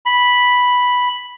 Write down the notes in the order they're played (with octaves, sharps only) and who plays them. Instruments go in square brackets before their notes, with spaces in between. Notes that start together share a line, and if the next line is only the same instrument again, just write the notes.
[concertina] B5